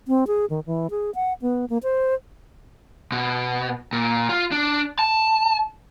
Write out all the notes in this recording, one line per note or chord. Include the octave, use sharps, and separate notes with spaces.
C4
G#4
D#3
E3
G#4
F#5
B3
A#3
C5
B2
A#2
F4
D4
A5